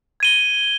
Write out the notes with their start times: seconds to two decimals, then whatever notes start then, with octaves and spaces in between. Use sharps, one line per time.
0.20 G#6 D#7 G7